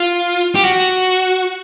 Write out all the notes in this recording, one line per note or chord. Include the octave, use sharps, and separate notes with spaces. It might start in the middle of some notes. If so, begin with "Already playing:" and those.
Already playing: F4
G4
F#4